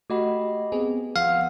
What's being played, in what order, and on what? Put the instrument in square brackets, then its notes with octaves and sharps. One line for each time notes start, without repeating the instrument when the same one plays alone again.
[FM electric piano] A3 F#4 [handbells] G4 D#5 B5
[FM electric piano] B3 C4 G#4
[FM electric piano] F3 [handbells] B3 F#5 [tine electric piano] F5